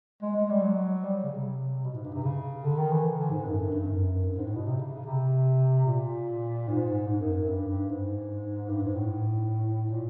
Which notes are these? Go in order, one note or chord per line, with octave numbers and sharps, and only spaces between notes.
G#3
G#3
G3
F#3
G3
C#3
C3
B2
G#2
G2
C3
C#3
D3
D#3
E3
D3
G#2
F#2
G2
G2
F#2
G2
G#2
A2
B2
C3
C#3
C#3
C3
A#2
G#2
G#2
F#2
F#2
G2
G2
G#2
G2
G#2
A2
A#2